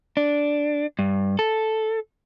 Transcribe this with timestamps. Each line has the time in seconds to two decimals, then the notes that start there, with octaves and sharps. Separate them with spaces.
0.17 D4
0.99 G2
1.39 A4